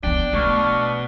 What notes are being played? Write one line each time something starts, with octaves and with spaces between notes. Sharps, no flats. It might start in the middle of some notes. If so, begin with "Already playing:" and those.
F#3 B3 D4 G5
B2 A3 C#6 F6